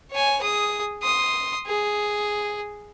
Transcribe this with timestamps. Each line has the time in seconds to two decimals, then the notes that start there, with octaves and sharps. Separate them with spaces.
0.12 C#5 G#5
0.41 G#4 D#6
1.02 C6 D#6
1.67 G#4